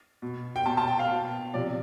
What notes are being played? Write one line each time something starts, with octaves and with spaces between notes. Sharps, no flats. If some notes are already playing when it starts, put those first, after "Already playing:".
B2
G5
B2 A5
A5
G5
F5
B2
C3 F3 D5